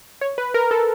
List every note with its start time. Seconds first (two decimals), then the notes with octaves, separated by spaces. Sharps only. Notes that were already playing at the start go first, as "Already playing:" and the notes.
0.21 C#5
0.38 B4
0.54 A#4
0.71 A4